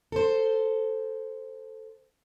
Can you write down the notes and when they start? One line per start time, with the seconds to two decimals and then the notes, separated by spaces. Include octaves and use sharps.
0.12 A4 C5